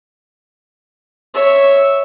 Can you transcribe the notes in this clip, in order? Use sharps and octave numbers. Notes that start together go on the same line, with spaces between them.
C#5 E5